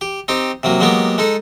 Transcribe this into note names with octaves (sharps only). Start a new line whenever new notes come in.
G4
C4 D#4 G4
C3 F#3 A#3
F#3 G#3 A#3 B3 G4
G#3 D#4 A4